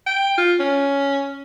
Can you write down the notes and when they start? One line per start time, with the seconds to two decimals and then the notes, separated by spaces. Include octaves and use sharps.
0.07 G5
0.38 F4
0.60 C#4